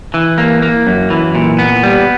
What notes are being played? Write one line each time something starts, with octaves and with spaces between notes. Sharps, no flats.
E3
A#3
A#3
F#2
E3
A#2
B3
G3